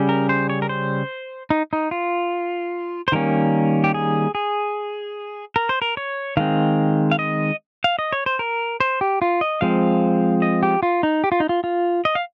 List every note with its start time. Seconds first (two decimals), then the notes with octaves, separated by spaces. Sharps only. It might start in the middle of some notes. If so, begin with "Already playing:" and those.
Already playing: C#3 G3 C#4
0.09 A#4
0.29 C5
0.50 C#5
0.62 A#4
0.69 C5
1.50 D#4
1.73 D#4
1.91 F4
3.08 C5
3.12 D#3 G3 A#3 C#4 A#4
3.84 G4
3.94 G#4
4.35 G#4
5.56 A#4
5.69 C5
5.82 A#4
5.97 C#5
6.37 D#3 G#3 C4 F5
7.11 F5
7.19 D#5
7.84 F5
7.99 D#5
8.13 C#5
8.26 C5
8.39 A#4
8.80 C5
9.01 G4
9.22 F4
9.41 D#5
9.61 F3 G#3 C4 F5
10.42 D#5
10.63 G4
10.83 F4
11.03 D#4
11.24 G4
11.32 F4
11.40 D#4
11.49 F4
11.64 F4
12.05 D#5
12.15 F5